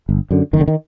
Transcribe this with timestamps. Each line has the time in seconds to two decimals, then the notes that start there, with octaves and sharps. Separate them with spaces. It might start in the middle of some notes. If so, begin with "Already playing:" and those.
0.09 G1
0.31 F#2 D3
0.53 F#1 D#3
0.60 D3
0.68 D#3